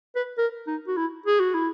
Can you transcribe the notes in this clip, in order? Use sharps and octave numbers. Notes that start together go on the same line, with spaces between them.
B4
A#4
D#4
F#4
E4
G#4
F#4
E4